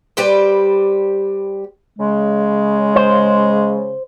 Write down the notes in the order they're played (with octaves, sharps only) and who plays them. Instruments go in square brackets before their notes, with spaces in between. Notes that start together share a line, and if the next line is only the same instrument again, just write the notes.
[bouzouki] G3 G4 B4 C5
[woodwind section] C#3 G#3
[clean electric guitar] C5